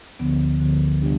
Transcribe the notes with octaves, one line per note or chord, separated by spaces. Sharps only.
D2 D3 F3 B3
D2 D3 F3 B3
C3 G3 B3 D4 G4